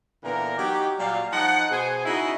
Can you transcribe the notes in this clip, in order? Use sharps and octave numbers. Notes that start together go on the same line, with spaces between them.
A#2 D3 E3 B3 A#4
F#3 D#4 G4
A#2 F#3 G3 D5 F5
F3 D#4 F#5
B2 G#4 C5 G#5
C#3 D#4 E4 F#4 D#5